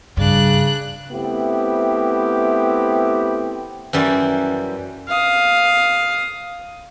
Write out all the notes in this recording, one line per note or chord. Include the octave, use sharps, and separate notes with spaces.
G2 C#3 D4 F#6
A3 B3 C4 E4 G4
F#2 E3 G3
F5 D#6